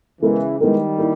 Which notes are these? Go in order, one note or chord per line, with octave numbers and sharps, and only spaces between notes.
C#3 E3 G#3 B3 E4 A#4
D#3 G3 G#3 B3 E4 A#4
A#3 E4